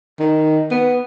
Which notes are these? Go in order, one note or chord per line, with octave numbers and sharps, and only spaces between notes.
D#3
B3